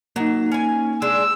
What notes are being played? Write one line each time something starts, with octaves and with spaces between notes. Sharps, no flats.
F#3 A#3 D#4
C#4 G#5
G#3 D4 E6